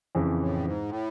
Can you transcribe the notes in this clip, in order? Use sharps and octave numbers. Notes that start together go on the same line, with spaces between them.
F2 C#3 E3
A2
G2
G#2
A2